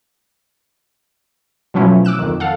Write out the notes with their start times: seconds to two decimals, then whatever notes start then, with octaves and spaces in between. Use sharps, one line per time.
1.74 B2 F3 F#3 A3 C#4 E4
2.05 D6 E6 F#6 E7
2.19 F2 D#3
2.40 A4 F5 F#5